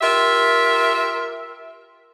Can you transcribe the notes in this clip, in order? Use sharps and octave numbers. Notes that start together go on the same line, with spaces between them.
F4 G4 A#4 E5